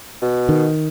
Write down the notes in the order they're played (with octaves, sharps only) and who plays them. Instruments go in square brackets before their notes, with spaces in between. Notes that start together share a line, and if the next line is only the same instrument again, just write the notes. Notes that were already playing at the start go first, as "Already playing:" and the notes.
[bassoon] B2
[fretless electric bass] D#3